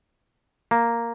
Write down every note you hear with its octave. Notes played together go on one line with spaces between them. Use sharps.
A#3